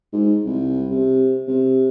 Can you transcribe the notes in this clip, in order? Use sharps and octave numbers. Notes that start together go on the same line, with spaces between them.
G#2
C2
C3
C3